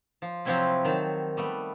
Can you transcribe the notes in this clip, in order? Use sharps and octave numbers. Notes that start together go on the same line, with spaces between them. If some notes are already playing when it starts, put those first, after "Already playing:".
F3
C3 F3 F#3 C4 E4 B4
D#3 F#3 A5
G3 A3 B3